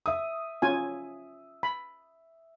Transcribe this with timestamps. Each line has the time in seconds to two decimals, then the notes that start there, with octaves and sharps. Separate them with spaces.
0.06 E5 D#6
0.62 C#4 F4 G#5
1.63 B5